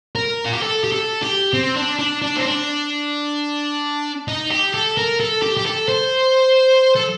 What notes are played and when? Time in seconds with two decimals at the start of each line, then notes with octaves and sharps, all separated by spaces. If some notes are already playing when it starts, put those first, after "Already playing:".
0.16 A#4
0.45 F4
0.53 G4
0.62 A4
0.84 G4
0.92 A4
1.23 G4
1.54 C4
1.76 D4
1.99 D4
2.22 D4
2.37 C4
2.45 D4
4.28 D#4
4.51 G4
4.74 A4
4.97 A#4
5.20 A4
5.42 G4
5.57 G4
5.66 A4
5.88 C5
6.96 A4